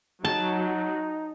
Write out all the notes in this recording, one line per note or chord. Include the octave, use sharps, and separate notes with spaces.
F#3 D#4 A5